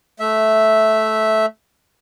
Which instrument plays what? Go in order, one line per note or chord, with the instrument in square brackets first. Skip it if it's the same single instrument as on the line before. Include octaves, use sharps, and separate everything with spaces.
[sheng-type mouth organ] A3 E5